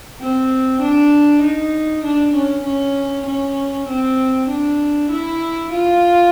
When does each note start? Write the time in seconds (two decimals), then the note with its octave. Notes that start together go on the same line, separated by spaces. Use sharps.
0.20 C4
0.82 D4
1.43 D#4
2.04 D4
2.35 C#4
2.65 C#4
3.27 C#4
3.89 C4
4.49 D4
5.11 E4
5.72 F4